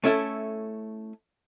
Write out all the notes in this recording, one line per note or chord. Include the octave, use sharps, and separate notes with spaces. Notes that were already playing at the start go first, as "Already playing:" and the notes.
A3 C#4 E4 A4 E5